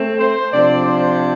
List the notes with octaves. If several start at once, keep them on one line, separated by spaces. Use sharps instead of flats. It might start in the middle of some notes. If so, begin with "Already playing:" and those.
Already playing: A3 C4
C5
C3 F3 D4 D5
C5